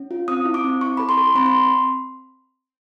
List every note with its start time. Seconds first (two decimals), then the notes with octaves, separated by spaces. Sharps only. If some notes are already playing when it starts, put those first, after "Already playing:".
Already playing: C#4
0.11 F4
0.28 C4 D#6
0.45 E4
0.54 D6
0.64 C4
0.81 E4 C#6
0.97 A4 B5
1.09 C6
1.17 A4
1.35 C4 B5
1.46 C6